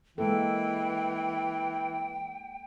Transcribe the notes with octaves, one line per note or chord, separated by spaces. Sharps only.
E3 G#3 A#3 A4 G5